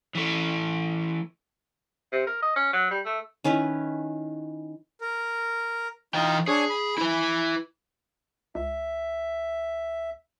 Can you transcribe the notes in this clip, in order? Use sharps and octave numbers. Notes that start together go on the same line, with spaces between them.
E3 A3
C3
A#4
D#5
C#4
F#3
G3
A3
D#3 C#4 E4 B4
A#4
E3 D#4 F4 G5 A#5
D4 G#4 C#5
B5
E4 B4
C#2 E5